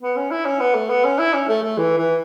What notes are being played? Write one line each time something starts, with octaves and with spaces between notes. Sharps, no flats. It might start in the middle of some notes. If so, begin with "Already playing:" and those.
B3
C#4
E4
C#4
B3
A3
B3
C#4
E4
C#4
A3
A3
E3
E3